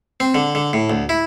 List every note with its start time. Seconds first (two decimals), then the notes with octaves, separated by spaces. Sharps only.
0.20 C4
0.34 D3
0.55 D3
0.73 A2
0.90 D2
1.09 E4